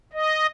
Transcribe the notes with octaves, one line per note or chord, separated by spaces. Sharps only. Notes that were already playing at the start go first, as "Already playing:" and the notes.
D#5